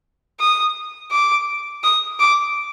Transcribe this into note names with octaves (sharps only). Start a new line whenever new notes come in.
D#6
D6
D#6
D6